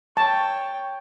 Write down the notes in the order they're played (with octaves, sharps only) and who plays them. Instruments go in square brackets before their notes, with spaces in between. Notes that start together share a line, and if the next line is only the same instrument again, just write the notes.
[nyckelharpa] C#5 G5 [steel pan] A5